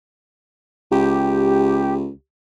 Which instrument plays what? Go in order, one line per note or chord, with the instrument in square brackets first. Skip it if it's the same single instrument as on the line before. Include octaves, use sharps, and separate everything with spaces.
[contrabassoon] C#2 [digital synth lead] G4